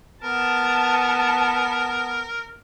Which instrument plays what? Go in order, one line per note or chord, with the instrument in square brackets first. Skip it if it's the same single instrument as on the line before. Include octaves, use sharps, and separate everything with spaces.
[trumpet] B3 [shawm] A#4 [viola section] A5